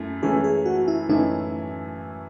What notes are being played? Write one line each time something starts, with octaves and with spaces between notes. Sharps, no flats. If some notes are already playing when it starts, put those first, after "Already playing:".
Already playing: F#2 A3 E4
F#2 E3 A3 C#4 E4 G#4
G#4
F#4
E4
F#2 E3 A3 C#4 D#4 E4